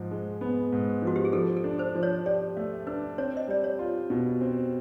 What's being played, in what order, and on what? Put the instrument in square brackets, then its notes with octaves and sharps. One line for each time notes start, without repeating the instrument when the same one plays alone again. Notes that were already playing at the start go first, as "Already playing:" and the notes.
Already playing: [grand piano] G#2 F3
G#3
B3
G#2
[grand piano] F3 [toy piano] F#4
[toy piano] G4
G#4
[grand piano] F3 [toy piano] A4
[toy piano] A4
[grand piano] D4
[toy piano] C5
[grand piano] F3
[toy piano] C#5
[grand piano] G4 [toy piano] D5
[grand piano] A3
[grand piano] D4 [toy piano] B4
[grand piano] C4 [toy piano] C#5
[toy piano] D#5
[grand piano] G3 [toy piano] D5
[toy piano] C#5
[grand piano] F4
B2
C4